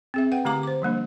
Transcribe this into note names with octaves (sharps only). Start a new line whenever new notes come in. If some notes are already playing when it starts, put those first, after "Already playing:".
C4 G#4 E5
B4 F#5 G5
D3 A3 G4 F5 A#5 D6
C5 D6
F3 G3 A#3 D4